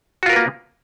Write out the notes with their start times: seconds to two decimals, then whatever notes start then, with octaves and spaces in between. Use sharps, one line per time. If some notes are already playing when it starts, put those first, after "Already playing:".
0.23 F#4
0.26 F4
0.29 A#4
0.33 B4
0.36 A#3